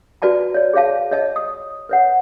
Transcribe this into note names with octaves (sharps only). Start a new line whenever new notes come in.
F#4 B4 D5 A5 A#5
C#5 D5
G#4 C5 C#5 F5 A5
C#5 D#5 A5
D#6
B4 C#5 F#5